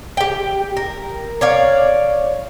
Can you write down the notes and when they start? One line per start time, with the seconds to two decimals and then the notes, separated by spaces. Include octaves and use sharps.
0.17 G4 G5
0.77 A#4
1.41 C#5 D5 F5